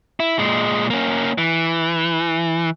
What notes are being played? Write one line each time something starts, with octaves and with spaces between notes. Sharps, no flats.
E4
A#2 G#3
A#3 C#4
E3